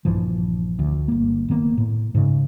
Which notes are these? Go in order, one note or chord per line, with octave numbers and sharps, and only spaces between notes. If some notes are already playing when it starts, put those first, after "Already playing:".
A#1 G2 E3 F3
D2
G1 A#3
F#1 D#3 A#3 B3
A2
G#2 C#3